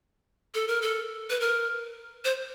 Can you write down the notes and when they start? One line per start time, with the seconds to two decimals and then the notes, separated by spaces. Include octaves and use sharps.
0.54 A4
0.68 A#4
0.82 A4
1.30 B4
1.40 A#4
2.25 C5